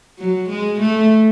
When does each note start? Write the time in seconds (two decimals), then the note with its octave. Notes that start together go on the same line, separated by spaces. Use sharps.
0.18 F#3
0.49 G#3
0.80 A3